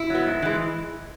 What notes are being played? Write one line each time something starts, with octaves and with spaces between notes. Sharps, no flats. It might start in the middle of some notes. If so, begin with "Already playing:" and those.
Already playing: E4
F#3 B3
G#2
E3 G#3